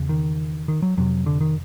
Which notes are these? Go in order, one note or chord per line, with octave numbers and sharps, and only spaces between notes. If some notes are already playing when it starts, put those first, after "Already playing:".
Already playing: E2 C#3
D#3
D#3
F#3
F2 C3 F#3
D3
D#3